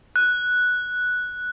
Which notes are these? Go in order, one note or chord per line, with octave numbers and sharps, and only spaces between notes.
F#6